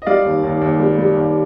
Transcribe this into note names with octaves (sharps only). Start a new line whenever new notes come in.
D#5
G3 D5 F5
D#2
D#2
D#2
G3
G3
D#2